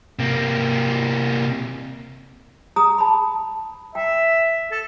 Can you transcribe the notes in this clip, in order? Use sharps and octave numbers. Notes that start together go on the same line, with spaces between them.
C3 A#3
G#4 A#5 D#6
A5 B5
E5 G5
A4